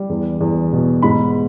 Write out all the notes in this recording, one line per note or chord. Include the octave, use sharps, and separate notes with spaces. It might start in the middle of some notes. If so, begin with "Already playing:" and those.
Already playing: G3
E2
E2
B2
G#2 B5